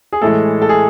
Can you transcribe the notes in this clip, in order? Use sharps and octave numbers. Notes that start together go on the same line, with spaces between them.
G#4
A2 E3 G#3 A4
A4
G#4